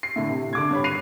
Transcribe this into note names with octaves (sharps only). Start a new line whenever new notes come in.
C7
A2 D3
C3
D3 D6 G#6
G2 C#5 B5
F#6 C7 D#7 F7